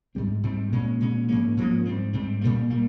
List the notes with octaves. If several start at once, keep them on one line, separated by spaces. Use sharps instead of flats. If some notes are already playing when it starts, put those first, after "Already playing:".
G#2 G3 C4
G#2 G3 C4
A#2 G#3 C#4
A#2 G#3 C#4
G#2 F3 A#3 C#4
G#2 F3 A#3 C#4
G#2 G3 C4
G#2 G3 C4
A#2 G3 A#3
A#2 G3 A#3